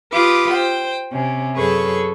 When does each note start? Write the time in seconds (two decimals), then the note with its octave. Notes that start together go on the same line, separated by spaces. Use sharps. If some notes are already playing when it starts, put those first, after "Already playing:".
0.12 F4 G4 B4 D6 D#6
0.50 C5 G5
1.11 C3 C#4
1.55 F#2 G#4 A4 B4 C#5 C#6